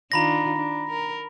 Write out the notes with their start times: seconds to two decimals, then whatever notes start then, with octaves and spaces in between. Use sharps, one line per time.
0.12 D#3 D4 F4 A#5 B5 A#6
0.56 D4
0.90 A#4